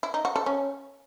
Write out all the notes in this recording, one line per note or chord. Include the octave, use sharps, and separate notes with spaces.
E4
D#4
F#4
A4
C#4